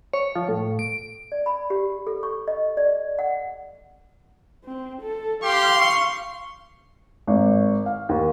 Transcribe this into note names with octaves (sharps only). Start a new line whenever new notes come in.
C#5
F3
A2
D7
D5
B5
G4
A4
C#6
D#5
D5
F#5
C4
A4
G4 F5 C6
C#6
G#1
F5
D#2